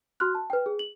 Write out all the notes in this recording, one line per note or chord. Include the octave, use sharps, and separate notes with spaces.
F#4 C6 F6 F#6
A5
B4 G5
G#4
F#7